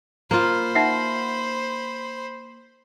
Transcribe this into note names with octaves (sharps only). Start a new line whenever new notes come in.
A#3 F4 C5 B5
D#4 E5 F#5